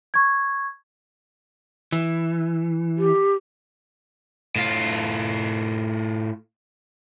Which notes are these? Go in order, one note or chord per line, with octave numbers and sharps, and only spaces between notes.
C#6 G#6
E3
G4
A2 F4